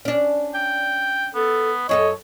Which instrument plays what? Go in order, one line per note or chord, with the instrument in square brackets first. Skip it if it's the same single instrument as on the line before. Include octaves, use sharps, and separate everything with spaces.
[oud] C#4 D4
[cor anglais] G5
[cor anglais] B3 [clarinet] A4
[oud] F#2 G#4 A4 [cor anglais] C#5 [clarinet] D#5